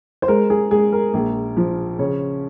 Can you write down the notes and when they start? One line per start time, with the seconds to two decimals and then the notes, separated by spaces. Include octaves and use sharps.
0.22 C5
0.28 G#3 A#4
0.50 G#4
0.71 G#3 G#4
0.92 A#4
1.14 A#1
1.57 F3
1.99 C#3 C#5